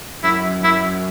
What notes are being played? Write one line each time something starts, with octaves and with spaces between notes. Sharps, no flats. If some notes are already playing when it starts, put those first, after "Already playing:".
F#2 E4
F#2 E4